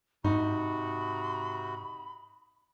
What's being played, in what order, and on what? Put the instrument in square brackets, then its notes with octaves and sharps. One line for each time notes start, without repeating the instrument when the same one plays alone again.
[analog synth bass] G#2 [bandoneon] C3 F#4 [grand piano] D#4 [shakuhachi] B5